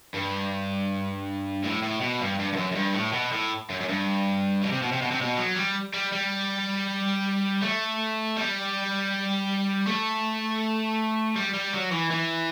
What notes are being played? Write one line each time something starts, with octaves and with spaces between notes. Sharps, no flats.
G2
A2
A2
B2
G2
G2
G2
F#2
F#2
G2
A2
B2
A2
F#2
F#2
G2
B2
C3
B2
C3
B2
C3
B2
F#3
G3
G3
G3
A3
G3
A3
G3
G3
F#3
E3
E3